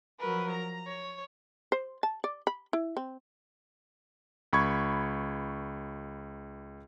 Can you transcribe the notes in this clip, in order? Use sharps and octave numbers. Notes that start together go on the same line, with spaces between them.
F3 F#3 A#4 B4
A#5
C#5
C5
A5
D5
B5
E4
C4
C#2 B5 C#6 G#6